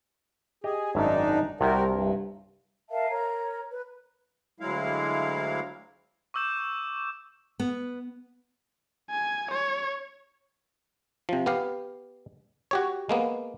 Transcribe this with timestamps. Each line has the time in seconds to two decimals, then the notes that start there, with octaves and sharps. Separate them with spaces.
0.64 G4 G#4 D#5
0.95 G#1 F#2 D4 D#4 E5
1.61 C2 C3 F#4 G4 A#4
1.87 G2
2.89 A#4 E5 F5 A5
3.10 A#4 C#5 A#5
3.71 B4
4.60 D2 F#3 G#3 E4 F5
6.34 C#6 D6 E6 G6 E7
7.60 B3
9.10 G#5
9.51 C#5
11.29 C3 F3
11.46 B3 G4 F5
12.71 F#4 G4 C#5
13.09 G#3 A#3 B3